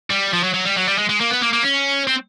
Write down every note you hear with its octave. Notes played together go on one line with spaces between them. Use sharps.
G3
F3
F#3
F#3
G3
F#3
G3
G#3
G#3
A#3
B3
A#3
A#3
C#4
C4